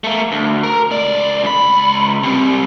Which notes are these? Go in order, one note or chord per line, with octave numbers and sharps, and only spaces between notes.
A3 A#3
D2
A#4
C#2 D5
C#2 B5
C3 G3